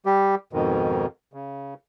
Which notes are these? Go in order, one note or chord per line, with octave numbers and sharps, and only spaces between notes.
G3 G4
F2 G#2 B2 D#3
C#3